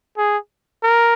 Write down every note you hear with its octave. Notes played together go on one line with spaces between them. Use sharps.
G#4
A#4